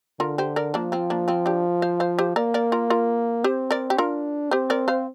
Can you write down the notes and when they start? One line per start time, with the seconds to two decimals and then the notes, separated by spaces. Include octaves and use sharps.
0.20 D3 F4 A#4
0.38 G4 C5
0.56 A#4 D5
0.74 F3 A#3 D4
0.92 C4 F4
1.10 A#3 D4
1.28 C4 F4
1.46 D4 G4
1.82 C5 F5
2.00 C5 F5
2.19 G4 C5
2.36 A#3 A#4 D5
2.54 A#4 D5
2.72 F4 A#4
2.90 F4 A#4
3.44 C4 G4 C5
3.71 A#4 D5
3.90 G4
3.98 D4 F4 A#4
4.51 C4 G4 C5
4.70 A#4 D5
4.88 C5 F5